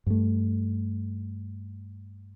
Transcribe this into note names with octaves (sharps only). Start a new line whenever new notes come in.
G2 A3